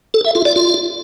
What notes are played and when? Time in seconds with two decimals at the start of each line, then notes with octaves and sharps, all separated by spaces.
0.14 A4
0.25 E5
0.35 F4
0.45 D5
0.56 F4